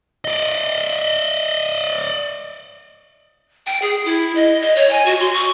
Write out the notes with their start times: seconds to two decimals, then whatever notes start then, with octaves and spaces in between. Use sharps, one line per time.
0.25 D5 D#5
3.67 G5
3.82 G#4
4.05 E4
4.36 D#5
4.62 D#5
4.76 C#5
4.91 G#5
5.06 F#4
5.20 C6
5.34 C#6